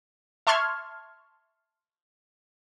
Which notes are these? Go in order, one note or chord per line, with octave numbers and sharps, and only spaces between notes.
E5 A5 C6 C#6 F6 G#6